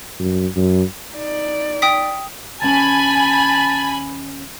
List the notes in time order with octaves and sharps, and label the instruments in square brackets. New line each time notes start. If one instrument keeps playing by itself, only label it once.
[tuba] F#2
F#2
[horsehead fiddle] D#4 D5
[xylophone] G5 D#6 B6
[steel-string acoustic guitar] D#2 C#4 [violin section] G#5 B5 [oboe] A5